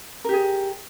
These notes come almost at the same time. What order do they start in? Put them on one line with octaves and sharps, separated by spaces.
A#4 G4 G#4